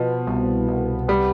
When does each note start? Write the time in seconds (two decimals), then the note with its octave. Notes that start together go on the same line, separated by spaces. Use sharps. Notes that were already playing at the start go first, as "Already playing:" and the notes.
Already playing: B2 F3 B3
0.27 C2
0.68 C2
1.08 G3 B3